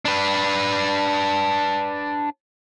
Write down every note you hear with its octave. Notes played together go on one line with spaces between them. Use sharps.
D4 B4